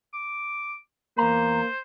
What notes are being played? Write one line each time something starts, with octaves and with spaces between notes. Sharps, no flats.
D6
E2 A#3 C5 A#5